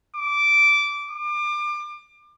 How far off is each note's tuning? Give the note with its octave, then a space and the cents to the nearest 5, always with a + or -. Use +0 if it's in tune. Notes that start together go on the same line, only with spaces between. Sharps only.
D6 -10
D6 +30